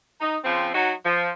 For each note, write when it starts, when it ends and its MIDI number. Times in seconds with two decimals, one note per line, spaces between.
0.21 0.37 63
0.44 0.69 49
0.44 0.69 53
0.44 0.69 60
0.74 0.92 54
0.74 0.92 63
0.74 0.92 66
1.05 1.30 53